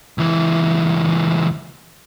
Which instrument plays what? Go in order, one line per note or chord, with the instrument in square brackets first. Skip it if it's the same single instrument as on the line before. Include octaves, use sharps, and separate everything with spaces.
[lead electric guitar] C#2 E3